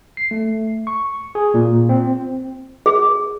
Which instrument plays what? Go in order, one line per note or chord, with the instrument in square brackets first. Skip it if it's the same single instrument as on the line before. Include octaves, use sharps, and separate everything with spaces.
[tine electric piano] C7
A3
C#6
G#4
A#2
C4
[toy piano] G#4